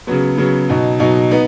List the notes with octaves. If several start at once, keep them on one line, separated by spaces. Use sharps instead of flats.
C#3 F#3 B3
C#3 F#3 B3
B2 F#3 D#4
B2 F#3 D#4
B3 D#4